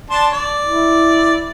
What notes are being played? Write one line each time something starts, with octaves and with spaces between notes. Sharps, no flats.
D4 A5 C6
D5
E4